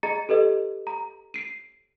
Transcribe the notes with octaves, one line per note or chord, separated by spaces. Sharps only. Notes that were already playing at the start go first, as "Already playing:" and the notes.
G#4 D#5 A#5 A6 C#7
G4 A4 B4 D#5
A#5
C7 D7 D#7